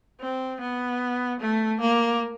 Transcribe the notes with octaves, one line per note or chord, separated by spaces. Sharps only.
C4
B3
A3
A#3